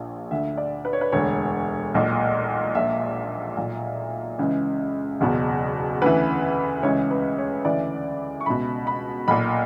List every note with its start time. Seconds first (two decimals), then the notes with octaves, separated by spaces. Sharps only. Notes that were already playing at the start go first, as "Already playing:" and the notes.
Already playing: A#1 A#2
0.31 D2 D3 E5
0.57 D5
0.85 B4
0.93 C#5
1.01 B4
1.12 E1 D2 D3 C#5
1.94 B1 A#2
2.75 A#1 A#2 E5
3.57 B1 A#2
4.39 C#2 C#3 E3
5.20 F#1 E2 B2
6.02 D2 C#3 E3 B4
6.83 C#2 C#3 E3 C#5
7.11 B4
7.38 C#5
7.65 D2 C#3 E3 D5
8.41 C#6
8.46 C#2 B2 B5
8.87 B5
9.28 B1 A#2 B5